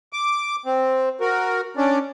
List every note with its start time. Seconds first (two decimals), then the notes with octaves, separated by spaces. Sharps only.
0.13 D6
0.66 C4
1.21 F#4 A#4
1.77 C#4 D4 D5